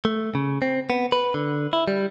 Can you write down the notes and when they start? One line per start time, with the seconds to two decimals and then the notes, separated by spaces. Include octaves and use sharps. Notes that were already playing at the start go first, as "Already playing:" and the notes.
0.05 A3
0.35 C#3
0.62 C4
0.90 B3
1.12 B4
1.34 D3
1.73 E4
1.88 G3